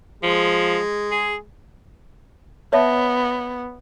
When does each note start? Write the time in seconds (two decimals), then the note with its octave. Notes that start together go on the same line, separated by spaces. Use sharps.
0.23 F3 G#3
1.11 G#4
2.73 B3 C#5 E5 A5